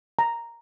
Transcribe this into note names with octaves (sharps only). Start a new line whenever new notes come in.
A#5